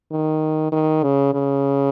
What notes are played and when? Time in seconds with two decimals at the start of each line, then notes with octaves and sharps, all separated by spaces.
0.12 D#3
0.72 D#3
1.03 C#3
1.34 C#3